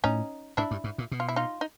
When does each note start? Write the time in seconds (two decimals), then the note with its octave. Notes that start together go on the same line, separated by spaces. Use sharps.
0.04 A2 C#4 D#4
0.57 G#2 D4 E4
0.71 G2
0.84 G#2
0.98 A#2
1.12 B2
1.20 F4
1.28 E4
1.36 D#4 F4
1.61 D#4